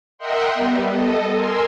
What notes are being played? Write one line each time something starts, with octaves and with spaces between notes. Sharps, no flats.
A#4 D#5 E5 F#5 G5 C6
G3 B3
A4 D#5
A#4 G#5 C6 E6